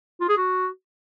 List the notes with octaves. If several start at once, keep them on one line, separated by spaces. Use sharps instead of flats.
F4
G#4
F#4